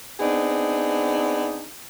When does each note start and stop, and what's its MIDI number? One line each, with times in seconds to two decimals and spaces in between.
0.20 1.66 59
0.20 1.66 60
0.20 1.66 62
0.20 1.66 63
0.20 1.66 68